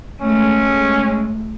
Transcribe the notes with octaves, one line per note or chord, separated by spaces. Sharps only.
G#3 A3 C#4